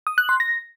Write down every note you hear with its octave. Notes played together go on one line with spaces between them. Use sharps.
D#6
F#6
C6
A#6